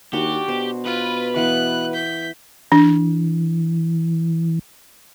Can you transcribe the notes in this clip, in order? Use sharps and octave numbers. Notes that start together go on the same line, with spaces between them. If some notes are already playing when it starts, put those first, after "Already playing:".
D#2 D4 F#4 G4
B2 C5
F4 B4
E3 B3 F5 F#6
G6 B6
E3 D4